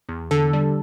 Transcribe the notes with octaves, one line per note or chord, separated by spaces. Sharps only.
E2
D3 A4
G3